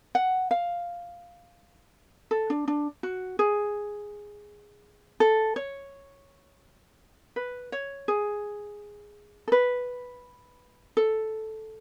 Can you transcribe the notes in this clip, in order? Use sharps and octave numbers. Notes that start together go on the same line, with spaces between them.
F#5
F5
A4
D4
D4
F#4
G#4
A4
C#5
B4
C#5
G#4
A4
B4
A4